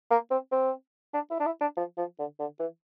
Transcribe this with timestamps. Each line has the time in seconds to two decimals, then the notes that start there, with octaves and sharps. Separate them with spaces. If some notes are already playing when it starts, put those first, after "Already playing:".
0.11 A#3
0.31 C4
0.52 C4
1.14 D4
1.31 E4
1.40 D4
1.46 E4
1.61 D4
1.77 F3
1.97 F3
2.19 D3
2.39 D3
2.59 E3